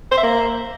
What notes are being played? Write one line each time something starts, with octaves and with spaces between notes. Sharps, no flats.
C5
E5
A#3